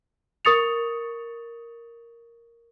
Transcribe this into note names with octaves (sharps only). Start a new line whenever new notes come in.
A#4 C#6 D#6 A6 C#7 F7